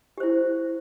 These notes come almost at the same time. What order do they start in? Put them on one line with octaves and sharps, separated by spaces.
G4 C5 E4